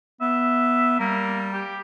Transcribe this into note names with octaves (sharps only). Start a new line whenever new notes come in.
B3 E5
G3 A#3
G4